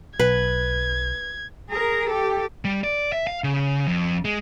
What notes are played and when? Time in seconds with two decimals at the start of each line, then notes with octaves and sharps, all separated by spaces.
0.20 B1 B4 G#6
1.70 G#4 A#4
2.10 G4 A4
2.65 G3
2.84 D5
3.12 E5
3.27 F5
3.44 C#3
3.87 F2
4.25 G#3